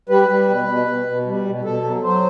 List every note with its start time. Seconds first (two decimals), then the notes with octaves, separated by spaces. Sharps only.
0.09 G3 B4
0.28 G3
0.48 B2
0.68 B2
0.87 B2
1.06 B2
1.27 G3
1.45 B2
1.65 B2 A4
1.84 F#3
2.03 F#3 C5